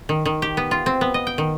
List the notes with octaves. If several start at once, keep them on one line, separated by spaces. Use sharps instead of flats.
D#3
D#3
G4
B3
F4
C4
B3
D#5
G5
D#3